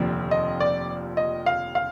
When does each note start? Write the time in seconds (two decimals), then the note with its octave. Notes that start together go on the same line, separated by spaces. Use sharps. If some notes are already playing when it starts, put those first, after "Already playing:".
Already playing: F1 D#2 D3 F3 C4
0.31 D#5
0.60 D5
1.17 D#5
1.46 F5
1.75 F5